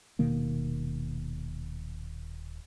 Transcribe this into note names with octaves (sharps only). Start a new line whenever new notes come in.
D#1 B2 D#3 A#3